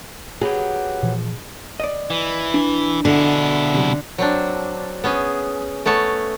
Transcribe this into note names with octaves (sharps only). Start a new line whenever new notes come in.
F#3 B3 G4 G#4
A#2 E3 F3
D5 D#5
E3
D4
B2 D3 E4
C3 F#3
F#3 C4 D4
B3 C#4 G#4
A3 B3 C#4 C#5 A5